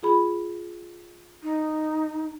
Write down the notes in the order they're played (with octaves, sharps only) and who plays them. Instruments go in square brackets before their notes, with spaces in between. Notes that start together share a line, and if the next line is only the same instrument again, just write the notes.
[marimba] F4 G#4 B5
[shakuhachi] D#4